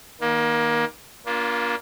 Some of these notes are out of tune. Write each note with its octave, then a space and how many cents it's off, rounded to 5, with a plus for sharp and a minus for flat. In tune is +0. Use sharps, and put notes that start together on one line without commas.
D#3 +0 A#3 +25
A#3 +25 D4 -30 F4 +0